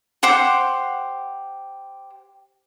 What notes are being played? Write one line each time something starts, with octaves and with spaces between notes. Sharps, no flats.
G4 C5 F#5 D6